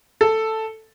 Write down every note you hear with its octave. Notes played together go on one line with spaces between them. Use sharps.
A4